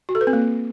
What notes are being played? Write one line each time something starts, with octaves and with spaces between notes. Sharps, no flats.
F#4
A4
B4
C4
A#3